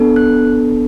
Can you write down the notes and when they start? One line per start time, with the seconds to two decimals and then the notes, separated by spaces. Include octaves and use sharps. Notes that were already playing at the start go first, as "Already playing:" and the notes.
Already playing: B3 D4 A4
0.16 F#6